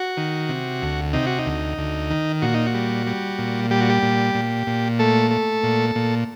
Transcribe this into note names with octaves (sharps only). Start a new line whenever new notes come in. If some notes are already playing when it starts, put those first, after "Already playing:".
Already playing: F#4
D#3
C3
D2
C3 D#4
F#4
D#4
D2
D2
D#3
A#2 F#4
D#4
F#4
G3
G3
A#2
G3 G4
F#4
G4
A#2
A#2
A#2
A3 A4
A3
A#2
A#2